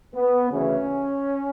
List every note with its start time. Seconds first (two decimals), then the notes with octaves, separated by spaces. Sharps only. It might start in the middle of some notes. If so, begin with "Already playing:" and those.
0.14 B3
0.51 D2 C#3 E3 C#4